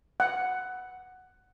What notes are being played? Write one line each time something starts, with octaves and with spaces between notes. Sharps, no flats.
F#5